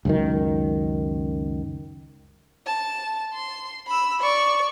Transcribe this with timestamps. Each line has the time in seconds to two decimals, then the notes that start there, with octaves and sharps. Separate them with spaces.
0.05 C#2 F#2 D#3
2.66 A5
3.34 C6
3.87 B5 E6
4.21 D5 C#6